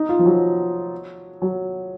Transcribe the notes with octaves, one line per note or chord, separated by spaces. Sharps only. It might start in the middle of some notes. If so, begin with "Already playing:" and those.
Already playing: D#4
F4
F3
F#3
F#3